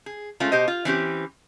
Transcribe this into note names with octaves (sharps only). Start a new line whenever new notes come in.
G#4
G#3 A3 C#4 F4
B2 G4 C5 D#5
F4
E3 C4 C#4 G4